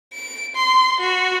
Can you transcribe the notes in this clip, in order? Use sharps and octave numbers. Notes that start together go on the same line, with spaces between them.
D7
C6
F#4